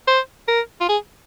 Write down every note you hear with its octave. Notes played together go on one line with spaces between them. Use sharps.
C5
A#4
F4
G#4